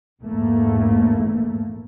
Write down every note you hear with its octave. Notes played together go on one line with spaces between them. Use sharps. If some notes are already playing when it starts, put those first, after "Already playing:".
A#1 E2 G#2 A3 A#3